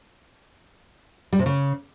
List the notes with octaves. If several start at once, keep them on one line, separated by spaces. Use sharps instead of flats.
G3
C3
C#3